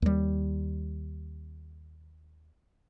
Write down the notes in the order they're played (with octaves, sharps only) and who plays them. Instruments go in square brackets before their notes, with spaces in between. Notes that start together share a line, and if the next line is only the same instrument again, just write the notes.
[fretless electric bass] D#2 G3